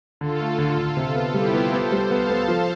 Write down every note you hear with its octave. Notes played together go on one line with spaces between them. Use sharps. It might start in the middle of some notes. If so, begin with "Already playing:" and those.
D3 F4 A4
A3
D3
D3
C3
B3
G3 E4 G4
B3
B3 A4 C5
G3
B3 F5 A5
B3
F3